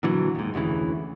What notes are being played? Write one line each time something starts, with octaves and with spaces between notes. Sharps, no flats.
A#2 D3 E3 F#3
D#2 G#2
F1 D2 C#3 E3